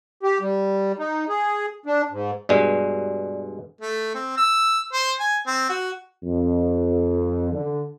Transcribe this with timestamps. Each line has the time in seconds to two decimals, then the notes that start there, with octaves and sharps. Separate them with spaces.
0.23 G4
0.40 G3
0.99 D#4
1.29 G#4
1.86 D4
2.11 G#2
2.49 G2 B2 G#3 D5
3.81 A3
4.14 C4
4.37 E6
4.93 C5
5.20 G#5
5.47 C4
5.69 F#4
6.25 F2
7.53 D3